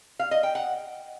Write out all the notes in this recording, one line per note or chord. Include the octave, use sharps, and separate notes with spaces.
F5
D#5
G5
F#5